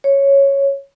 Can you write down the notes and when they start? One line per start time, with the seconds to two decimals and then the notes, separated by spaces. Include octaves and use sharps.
0.04 C#5